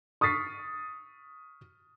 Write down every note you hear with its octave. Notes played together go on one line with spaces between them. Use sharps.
C#6 D#6 F6 A6 B6 C7